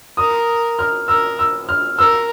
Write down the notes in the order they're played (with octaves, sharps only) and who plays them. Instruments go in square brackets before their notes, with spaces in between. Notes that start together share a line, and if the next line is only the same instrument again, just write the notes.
[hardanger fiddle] A#4 [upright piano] D#6
[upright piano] F6
[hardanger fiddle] A#4 [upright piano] E6
[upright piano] E6
F6
[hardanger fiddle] A#4 [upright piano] E6